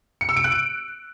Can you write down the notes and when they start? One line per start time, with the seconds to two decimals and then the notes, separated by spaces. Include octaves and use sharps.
0.21 C#7
0.29 E6
0.36 D7
0.44 F#6
0.52 D7